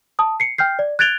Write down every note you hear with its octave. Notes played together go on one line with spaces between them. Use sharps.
A5 D#6
C7 C#7
G5 F6 G6 C7
D5
F#6 G#6 A6 D7 F7 G7